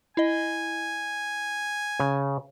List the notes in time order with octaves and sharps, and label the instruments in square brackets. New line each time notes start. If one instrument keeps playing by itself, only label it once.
[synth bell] E4 D#5 [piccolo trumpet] G#5
[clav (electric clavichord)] C#3